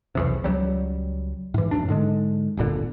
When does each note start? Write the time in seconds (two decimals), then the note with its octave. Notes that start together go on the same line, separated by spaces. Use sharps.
0.15 B1 E2 C3
0.44 C#2 F#3 G3
1.54 G#2 E3
1.71 D1 G#1 F#2 D4
1.88 G#2 D3 G#3
2.57 D1 G1 A#2 D3